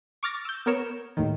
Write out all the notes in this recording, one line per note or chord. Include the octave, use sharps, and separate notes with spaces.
C#6 D6 F6 A6 A#6
E6 G6
B3 A#4 C#5 E7
D#2 A2 D#3